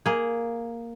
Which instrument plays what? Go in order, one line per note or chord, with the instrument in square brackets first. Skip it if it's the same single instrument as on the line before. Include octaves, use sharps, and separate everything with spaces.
[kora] A#3 G#4